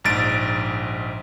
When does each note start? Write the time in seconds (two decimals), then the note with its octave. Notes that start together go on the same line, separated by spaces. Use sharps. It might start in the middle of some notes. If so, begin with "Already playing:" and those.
0.04 A#1 G#2 A6 D7